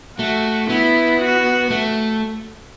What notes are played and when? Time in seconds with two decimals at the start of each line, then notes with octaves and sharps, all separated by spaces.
0.19 A3 F#4
0.69 B3 E4
1.20 F#4
1.70 A3